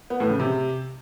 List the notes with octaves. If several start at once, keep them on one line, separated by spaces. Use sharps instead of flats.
B3
A2
C#3
C3